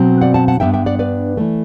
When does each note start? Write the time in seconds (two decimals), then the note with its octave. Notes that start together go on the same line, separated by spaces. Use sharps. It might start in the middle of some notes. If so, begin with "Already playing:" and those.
Already playing: B2 F#3 C4
0.21 D5 F#5
0.34 F#5 A5
0.48 F#5 A5
0.60 G2 F#3 B3 D4 E5 G5
0.74 E5 G5
0.86 D5 F#5
0.99 B4 D5
1.37 E3 A3